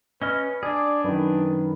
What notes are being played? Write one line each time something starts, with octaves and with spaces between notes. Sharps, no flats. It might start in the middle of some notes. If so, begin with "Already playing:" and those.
C#4 B4 D#5 F6
D4 G#4 D5
F#2 D#3 B4